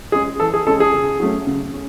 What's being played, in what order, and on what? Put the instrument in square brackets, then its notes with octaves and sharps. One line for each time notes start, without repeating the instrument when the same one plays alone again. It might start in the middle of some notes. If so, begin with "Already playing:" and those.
[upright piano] G#3 C#4 [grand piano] G#4
[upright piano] E3 [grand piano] A4
[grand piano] G#4
[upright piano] G#3 C#4 [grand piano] A4
[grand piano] G#4
[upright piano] C#3
F#3 A3 C#4
C#3
C#4